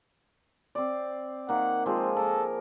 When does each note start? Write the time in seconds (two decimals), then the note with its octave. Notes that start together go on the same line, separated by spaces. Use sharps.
0.75 C4 D5
1.49 D#3 A#3 F#5
1.86 F3 G#3 C4
2.17 A4 A#4